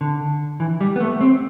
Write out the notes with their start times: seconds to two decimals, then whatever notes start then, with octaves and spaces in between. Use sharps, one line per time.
0.01 D3
0.60 E3
0.81 G3
0.96 B3
1.00 A3
1.21 C4